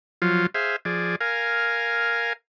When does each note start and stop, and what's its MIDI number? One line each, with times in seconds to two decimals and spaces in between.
0.22 0.46 53
0.22 0.46 54
0.22 0.46 65
0.54 0.76 68
0.54 0.76 72
0.54 0.76 76
0.54 0.76 77
0.85 1.16 53
0.85 1.16 68
0.85 1.16 74
1.21 2.33 70
1.21 2.33 77
1.21 2.33 80